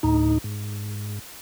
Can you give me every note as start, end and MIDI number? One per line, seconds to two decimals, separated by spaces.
0.03 0.38 38
0.03 0.38 45
0.03 0.38 63
0.44 1.19 44